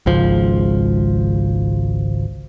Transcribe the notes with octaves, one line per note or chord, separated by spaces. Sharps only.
G#1 C#2 F3